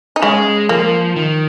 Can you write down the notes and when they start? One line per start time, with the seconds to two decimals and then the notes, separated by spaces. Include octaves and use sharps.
0.16 D#4
0.22 C#3 G#3 C#4
0.69 F3 A#3
1.16 D#3